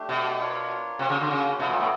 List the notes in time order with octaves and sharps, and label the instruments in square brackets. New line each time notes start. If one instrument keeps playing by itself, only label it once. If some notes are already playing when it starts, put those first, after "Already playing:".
Already playing: [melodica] A3 D4 G4
[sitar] B2
[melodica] D4 F4 A#4 C#5
[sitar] C3 [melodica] A#3 C#4 F#4
[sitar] C#3
D3
C#3
[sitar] B2 [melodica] F#3 B3 E4 A4
[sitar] A#2
A2